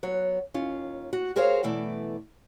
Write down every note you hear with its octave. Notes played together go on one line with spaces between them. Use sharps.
F#3 B3 C#5
D#2 C#4 F4
F#4
F#4 G#4 A#4 C5 C#5 F5
F#2 B2 E3 A3 D5